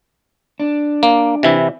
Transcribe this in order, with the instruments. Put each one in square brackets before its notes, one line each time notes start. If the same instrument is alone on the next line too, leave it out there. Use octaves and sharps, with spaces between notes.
[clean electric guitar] D4
[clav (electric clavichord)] A#3
C3 E3 E4